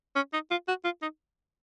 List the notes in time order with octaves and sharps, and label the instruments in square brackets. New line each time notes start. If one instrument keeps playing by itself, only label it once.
[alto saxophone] C#4
D#4
F4
F#4
F4
D#4